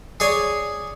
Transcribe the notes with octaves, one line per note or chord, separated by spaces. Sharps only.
G#4 C#5 D5 G#5